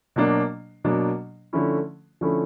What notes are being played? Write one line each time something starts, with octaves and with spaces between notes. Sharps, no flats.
B2 F#3 A#3 D4
B2 F#3 A#3 D4
D3 F3 A3 C#4 E4
D3 F3 A3 C#4 E4